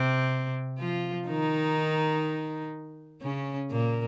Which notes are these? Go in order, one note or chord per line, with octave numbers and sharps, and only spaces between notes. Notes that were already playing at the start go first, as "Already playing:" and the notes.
Already playing: C3 C4
F3 F4
D#3 D#4
C#3 C#4
A#2 A#3